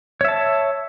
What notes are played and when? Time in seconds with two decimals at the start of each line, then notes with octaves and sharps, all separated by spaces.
0.21 C#5
0.25 E5
0.28 A5